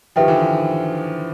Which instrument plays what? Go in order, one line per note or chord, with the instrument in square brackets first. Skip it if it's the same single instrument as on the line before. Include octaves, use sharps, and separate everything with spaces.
[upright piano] D#3 F3 [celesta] G4 B4 E5 G5
[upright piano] D3 E3
D#3